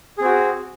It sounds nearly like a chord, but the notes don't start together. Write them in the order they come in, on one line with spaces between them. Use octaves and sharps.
G#4 C4 F#4